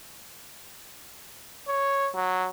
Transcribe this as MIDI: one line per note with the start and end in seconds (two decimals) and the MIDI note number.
1.68 2.10 73
2.15 2.48 54